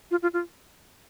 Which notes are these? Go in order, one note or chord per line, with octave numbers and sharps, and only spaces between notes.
F4
F4
F4